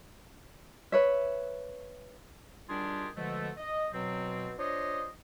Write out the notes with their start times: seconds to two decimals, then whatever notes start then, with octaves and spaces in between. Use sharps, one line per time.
0.92 B4 C#5 E5
2.69 D#3 G3 D4 F4 G4 G#4
3.16 B2 D3 F3 G#3 A3
3.57 D#5
3.93 B2 F#3 C4
4.58 D4 F4 C5 C#5 D#5